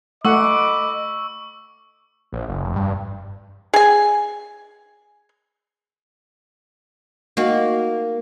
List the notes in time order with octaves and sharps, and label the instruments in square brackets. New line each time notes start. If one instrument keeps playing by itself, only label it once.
[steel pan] A3 F#5 [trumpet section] D#5 B5 D6 [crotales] C#6 E6
[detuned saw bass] A#1
F#1
F1
G2
[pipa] G#4 G#5
[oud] A#3 D#4 F#4